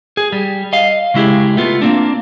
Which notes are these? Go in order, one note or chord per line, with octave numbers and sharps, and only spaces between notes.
G#4
G3
D#5 F5
C#3 G#3 E4 G4 G#4
A3 B3 F4
A#3 C4 D4